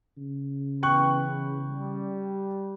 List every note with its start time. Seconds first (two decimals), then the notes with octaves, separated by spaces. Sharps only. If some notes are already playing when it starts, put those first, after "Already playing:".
0.17 C#3
0.83 E3 B3 B4 G5 C#6 F#6
1.68 G3